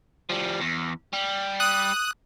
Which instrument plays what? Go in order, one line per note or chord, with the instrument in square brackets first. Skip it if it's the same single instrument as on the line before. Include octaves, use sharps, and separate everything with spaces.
[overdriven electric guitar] F3 G3
E2
G3
[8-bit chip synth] D#6 F#6